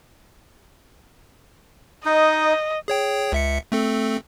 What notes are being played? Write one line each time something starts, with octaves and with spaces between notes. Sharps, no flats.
D#4 D#5
G#4 C#5 G5
C#2 E5 C#7
A3 C4 A4